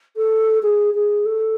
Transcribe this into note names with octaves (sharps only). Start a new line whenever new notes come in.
A4
G#4
G#4
A4